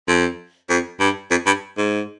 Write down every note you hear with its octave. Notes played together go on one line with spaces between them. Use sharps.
F2
F2
G2
F2
G2
G#2